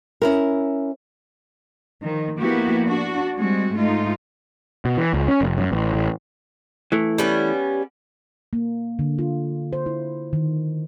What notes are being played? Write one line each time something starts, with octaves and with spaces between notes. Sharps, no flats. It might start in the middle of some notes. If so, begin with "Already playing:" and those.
C#4 E4 A#4
D#3 F3
F3 A#3 B3 E4 F#4 G4
D4 F#4
G3 G#3 C4 F#4
G#2 A3 D#4 F4
B2
E3
C#2
C#4
F1
F#2
A1
A1
E3 A3
G3 B3 C#4
A#3
D3
F4
C5
E4
D#3